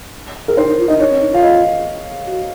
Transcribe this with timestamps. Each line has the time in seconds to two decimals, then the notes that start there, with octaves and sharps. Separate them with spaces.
0.48 A#4
0.57 D#4 C5
0.67 D#4
0.78 F4
0.88 D#4 D#5
0.99 D#4 C#5
1.10 C#4
1.21 D#4
1.32 F4 F5
1.42 D#5
2.27 F#4